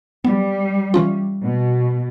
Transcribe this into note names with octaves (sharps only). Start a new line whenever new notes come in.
G3 B3
E3 C#4 F4
B2